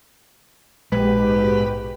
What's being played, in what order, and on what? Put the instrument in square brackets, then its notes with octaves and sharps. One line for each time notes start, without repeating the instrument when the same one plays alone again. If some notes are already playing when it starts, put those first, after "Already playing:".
[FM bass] A#1 [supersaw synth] G#2 B2 G4 [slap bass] G#3 [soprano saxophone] B4